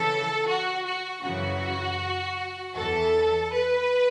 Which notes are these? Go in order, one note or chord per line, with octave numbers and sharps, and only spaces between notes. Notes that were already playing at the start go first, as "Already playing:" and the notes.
Already playing: C#3 E3 A4
F#4
F#4
F#2 C#3 E3 F#4
E2 E3 A4
B4